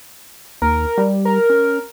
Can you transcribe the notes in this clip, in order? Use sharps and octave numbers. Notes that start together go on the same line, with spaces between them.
D#2 A#4
G3
A#4
C#4